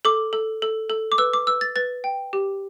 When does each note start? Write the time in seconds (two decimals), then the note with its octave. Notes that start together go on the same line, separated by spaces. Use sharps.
0.05 A4 D6
0.33 A4
0.62 A4
0.90 A4
1.12 D6
1.18 B4 E6
1.33 D6
1.47 B4 E6
1.61 A6
1.76 B4 A6
2.04 G5
2.33 G4